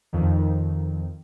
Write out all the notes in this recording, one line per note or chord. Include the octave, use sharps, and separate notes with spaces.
F2 D#3